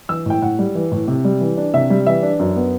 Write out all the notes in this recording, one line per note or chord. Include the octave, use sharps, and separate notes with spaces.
E3 E6
A2 G5
A2 F#5
G3
E3
A2
C3
G3
E3
D4
C3 E5
G3
E3 E5
D4
F#2
B3